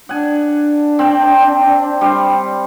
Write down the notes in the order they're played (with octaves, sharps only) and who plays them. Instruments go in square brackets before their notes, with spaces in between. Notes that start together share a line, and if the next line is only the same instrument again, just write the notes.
[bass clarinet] D4 [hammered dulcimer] F#5 G#5
[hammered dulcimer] C4 G5
G3 C5